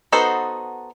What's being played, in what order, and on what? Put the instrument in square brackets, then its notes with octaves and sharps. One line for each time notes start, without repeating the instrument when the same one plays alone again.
[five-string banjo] B3 D#4 F#4 A4 C5